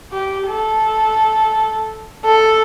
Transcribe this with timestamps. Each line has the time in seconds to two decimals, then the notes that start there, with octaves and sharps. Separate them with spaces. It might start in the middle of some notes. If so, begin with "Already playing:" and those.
0.12 G4
0.48 A4
2.25 A4